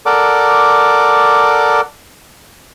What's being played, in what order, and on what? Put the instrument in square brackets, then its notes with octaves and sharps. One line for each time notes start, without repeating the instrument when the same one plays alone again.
[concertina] A4 A#4 D5 F#5 D6